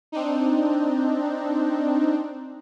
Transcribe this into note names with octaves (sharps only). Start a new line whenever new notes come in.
C4 D4 D#4